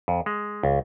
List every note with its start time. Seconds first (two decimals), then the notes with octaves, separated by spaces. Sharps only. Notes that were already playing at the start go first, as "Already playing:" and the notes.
0.08 F2
0.26 G#3
0.63 C#2